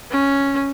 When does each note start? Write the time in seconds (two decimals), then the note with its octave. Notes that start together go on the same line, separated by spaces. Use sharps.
0.11 C#4